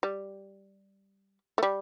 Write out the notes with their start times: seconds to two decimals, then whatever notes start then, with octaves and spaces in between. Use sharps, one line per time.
0.03 G3
1.58 A3
1.63 G3